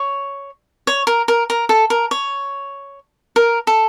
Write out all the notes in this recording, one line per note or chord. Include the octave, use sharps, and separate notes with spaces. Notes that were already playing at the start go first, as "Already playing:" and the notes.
Already playing: C#5
C#5
A#4
A#4
A#4
A4
A#4
C#5
A#4
A4